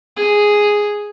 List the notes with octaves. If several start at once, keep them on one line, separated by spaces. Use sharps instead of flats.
G#4